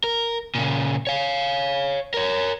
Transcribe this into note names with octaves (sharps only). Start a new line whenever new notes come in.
A#4
A#2 C#3
C#5 F5
A#4 C#5